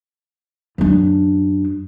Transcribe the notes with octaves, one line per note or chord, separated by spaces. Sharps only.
F#2 D4